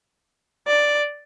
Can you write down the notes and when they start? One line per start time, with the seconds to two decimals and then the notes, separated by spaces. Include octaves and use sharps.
0.67 D5